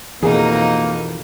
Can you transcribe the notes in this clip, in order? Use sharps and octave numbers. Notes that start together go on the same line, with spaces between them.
F2 B2 E3 A#3 D#4 G#4